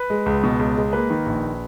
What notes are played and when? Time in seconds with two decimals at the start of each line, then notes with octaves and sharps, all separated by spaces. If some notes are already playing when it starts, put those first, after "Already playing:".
Already playing: B4
0.10 G#3
0.26 C#2
0.44 B2
0.59 C#2
0.77 G#3
0.93 A#3 B4
1.10 D#3
1.26 A#1